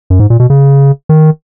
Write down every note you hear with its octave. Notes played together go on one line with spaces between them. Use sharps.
F#2
G#2
A#2
B2
C#3
D#3